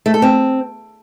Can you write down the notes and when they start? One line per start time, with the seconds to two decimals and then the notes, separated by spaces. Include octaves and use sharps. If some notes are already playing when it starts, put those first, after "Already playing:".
0.06 A3
0.14 A4
0.22 C4